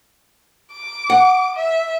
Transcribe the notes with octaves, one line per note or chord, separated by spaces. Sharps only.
D6
F#5
E5